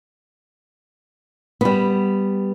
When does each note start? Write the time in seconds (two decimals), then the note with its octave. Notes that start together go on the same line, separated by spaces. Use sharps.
1.61 G3 B3